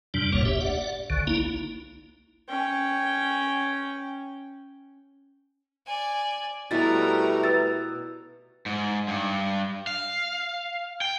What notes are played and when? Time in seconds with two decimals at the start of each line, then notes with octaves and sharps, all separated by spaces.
0.14 F2 C3 G3 D4
0.32 F#1 D2 A2 A#3 C#5
0.45 G4 E5
0.60 D5 F#5
1.10 G#1 C#2 D3
1.27 A#3 D#4 E4
2.48 C#4 G5
5.86 D5 G#5
6.71 B2 G3 A3 E4 A#4 A#5 A6
7.44 B4 E6 A6
8.66 G#2
9.08 G2
9.87 F5
11.01 G5